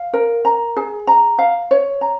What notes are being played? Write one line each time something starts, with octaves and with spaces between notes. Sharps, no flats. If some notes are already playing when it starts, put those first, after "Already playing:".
Already playing: F5
A#4
A#5
G#4
A#5
F5
C#5
A#5